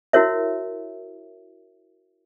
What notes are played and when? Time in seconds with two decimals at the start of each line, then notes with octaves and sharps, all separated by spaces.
0.13 E4 F#4 A#4 C#5 E5